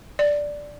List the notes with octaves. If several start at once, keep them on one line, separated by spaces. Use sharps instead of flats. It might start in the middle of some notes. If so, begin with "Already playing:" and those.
D5